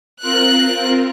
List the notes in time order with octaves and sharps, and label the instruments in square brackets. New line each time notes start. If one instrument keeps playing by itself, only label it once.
[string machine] C4 F4 A#4 [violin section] F#6